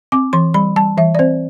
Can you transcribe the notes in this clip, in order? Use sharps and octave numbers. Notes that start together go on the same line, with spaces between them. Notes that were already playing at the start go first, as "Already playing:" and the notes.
C4 D6
E3 C6
G3 B5
G3 A5
E3 E5
D5
C4 C5